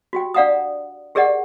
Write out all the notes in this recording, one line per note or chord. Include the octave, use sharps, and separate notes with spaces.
F#4 G4 G5
D4 D5 F5 F#5 A#5 D#6
G4 G#4 A#4 D5 D#5 F#5